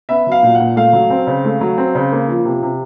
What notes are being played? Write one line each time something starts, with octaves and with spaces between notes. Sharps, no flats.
B3 E5
F#3 F5
A#2
F#5
A#2
A3 F5
F#3
C4
C#3
A3
F#3
C4
C#3
A#3
F3
C3
C3